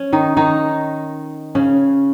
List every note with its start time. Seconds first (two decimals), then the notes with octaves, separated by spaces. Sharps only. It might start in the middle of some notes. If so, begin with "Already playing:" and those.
Already playing: C#4
0.13 D#3 D#4
0.37 D#3 D#4
1.55 C#3 C#4